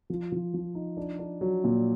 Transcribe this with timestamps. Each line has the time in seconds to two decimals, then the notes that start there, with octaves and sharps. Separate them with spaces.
0.10 F3
0.32 F3
0.54 F3
0.75 D#4
0.97 D4
1.19 D4
1.41 F#3
1.64 A#2